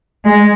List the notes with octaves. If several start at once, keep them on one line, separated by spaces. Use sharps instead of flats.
G#3